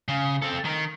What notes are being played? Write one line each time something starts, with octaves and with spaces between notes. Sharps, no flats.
C#3
C4 A4
D#3